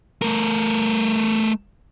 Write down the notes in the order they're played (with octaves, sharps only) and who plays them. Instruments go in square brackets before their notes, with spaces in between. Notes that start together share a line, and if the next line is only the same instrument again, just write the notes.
[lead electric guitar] A3 A#4